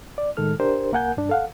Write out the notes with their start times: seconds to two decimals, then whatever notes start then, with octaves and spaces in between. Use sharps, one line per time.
0.18 D5
0.37 A2 D#3 G#3 A4 F6
0.60 D4 G4 A#4 C5
0.92 C2 A#3 A#4 F#5 G#5 G6
1.17 G2 D4
1.29 A4 F5 F#5